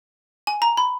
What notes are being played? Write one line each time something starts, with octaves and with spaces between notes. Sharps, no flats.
G#5
A#5
B5